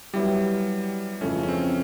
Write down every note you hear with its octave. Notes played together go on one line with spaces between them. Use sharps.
F#3 G3 B3 E4 G4
F2 C#3 E3 A3 C#4
C#4
C4